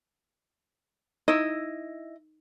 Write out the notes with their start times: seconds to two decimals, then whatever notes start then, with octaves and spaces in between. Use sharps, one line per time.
1.28 D#4 E4 D#5 E6